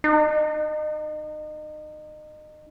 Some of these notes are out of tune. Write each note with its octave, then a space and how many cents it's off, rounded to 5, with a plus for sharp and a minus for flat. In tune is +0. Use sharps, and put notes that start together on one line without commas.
D#4 -30